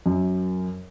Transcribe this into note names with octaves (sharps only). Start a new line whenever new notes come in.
F#2